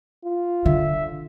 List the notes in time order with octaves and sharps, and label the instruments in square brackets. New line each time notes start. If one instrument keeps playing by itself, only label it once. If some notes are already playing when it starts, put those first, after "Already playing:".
[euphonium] F4
[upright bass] D3 [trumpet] E5